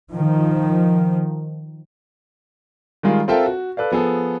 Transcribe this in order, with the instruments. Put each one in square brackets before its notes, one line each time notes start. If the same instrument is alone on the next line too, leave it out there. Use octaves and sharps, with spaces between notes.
[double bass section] D#3 F3
[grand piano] D#3 G3 G#3 F4
C4 F4 A4 A#4 E5 G5
F#4
A4 B4 D5 F5
F3 B3 G#4 A4